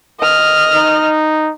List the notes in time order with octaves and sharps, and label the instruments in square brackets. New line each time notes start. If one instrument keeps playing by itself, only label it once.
[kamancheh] D#5 F6
[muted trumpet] D#4